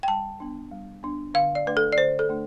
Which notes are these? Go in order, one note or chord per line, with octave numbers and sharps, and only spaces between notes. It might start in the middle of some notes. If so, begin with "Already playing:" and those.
G5
G3 A5
B3 D4
G3
B3 D4
D3 F5
D5
A3 D4 B4
A4
D5
D3 C5
A4
A3 D4